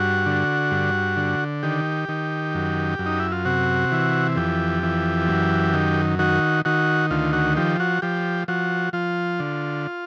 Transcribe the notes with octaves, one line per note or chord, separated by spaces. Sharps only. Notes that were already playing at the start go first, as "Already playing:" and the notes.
Already playing: G2 F#4
D3
G2
D3
D#3 G4
D#3
F#2
F#2
D#4
E4
F4
C3 F#4
E3
F2 G4
E3
F#2
D#3
D#3 F#4
D#3 F#4
D2 F4
F#4
F3 G4
F#4
F3 G4
F3 F#4
F3 F4
D3